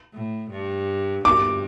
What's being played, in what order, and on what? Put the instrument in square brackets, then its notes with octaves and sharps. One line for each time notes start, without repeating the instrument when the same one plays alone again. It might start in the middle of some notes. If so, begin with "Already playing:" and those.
[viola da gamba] A2
G2
[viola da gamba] G2 [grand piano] D6